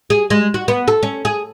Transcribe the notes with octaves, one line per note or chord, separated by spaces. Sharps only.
G#4
G#3
F#4
B3
A4
C#4
G#4